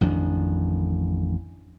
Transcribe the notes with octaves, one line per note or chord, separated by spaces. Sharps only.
A1 F2 D#3 D4